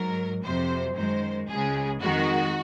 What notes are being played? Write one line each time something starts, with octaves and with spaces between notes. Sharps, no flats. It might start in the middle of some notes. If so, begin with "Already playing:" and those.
Already playing: G#2 F#3 A#4
F2 C3 F#3 C5
F#2 D#3 G#3 C5
C#2 C#3 G#3 G#4
F2 D#3 G#3 F#4